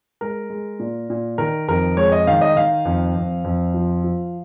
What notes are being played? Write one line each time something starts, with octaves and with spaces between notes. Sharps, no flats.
G#3 A#4
G#3
A#2
A#2
D#3 A#4
F2 A#4
G#3 C#5
D#5
D#3 F5
D#5
D#3 F5
F2
F2
F2
F3
F3